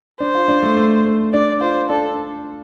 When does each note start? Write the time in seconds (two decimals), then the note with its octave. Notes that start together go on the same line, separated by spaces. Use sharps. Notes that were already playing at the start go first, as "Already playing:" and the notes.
0.20 D4 C5
0.35 F4
0.48 D4
0.63 A3
0.77 A3
1.06 A3
1.33 D4 D5
1.61 F4 C5
1.89 D4 A4